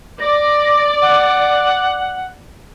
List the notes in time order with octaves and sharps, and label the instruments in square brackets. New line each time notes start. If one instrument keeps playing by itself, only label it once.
[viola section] D5 [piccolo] A#6
[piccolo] F#5